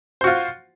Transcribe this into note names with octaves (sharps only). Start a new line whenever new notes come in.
F4 F#4 C5